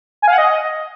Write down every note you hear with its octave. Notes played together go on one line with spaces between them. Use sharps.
G#5
F5
F#5
D#5